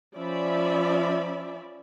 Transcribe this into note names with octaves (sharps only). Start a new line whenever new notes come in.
F3 C#4 D5 E5 B5